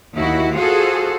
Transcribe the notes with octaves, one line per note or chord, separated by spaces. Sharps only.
D#2 E4 F#4
F4 F#4 G#4 A4 C5